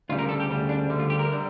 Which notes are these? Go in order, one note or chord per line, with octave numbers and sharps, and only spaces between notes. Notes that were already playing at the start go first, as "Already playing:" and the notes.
D2 C#3 G3 F4
A#4
A4
G4
D2 C#3 G3
D4
D2 D3 G3
F4
G4
A#4
D3 G3